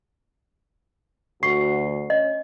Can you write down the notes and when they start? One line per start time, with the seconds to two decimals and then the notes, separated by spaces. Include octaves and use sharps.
1.43 D2 F#4 C#6 C7
2.10 C#4 D#5